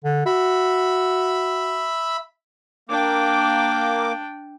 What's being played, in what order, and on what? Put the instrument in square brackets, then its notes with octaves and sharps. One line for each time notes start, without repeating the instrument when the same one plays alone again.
[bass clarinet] D3
[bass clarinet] F#4 [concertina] E5 B5
[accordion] A#3 D6 [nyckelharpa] D4 G5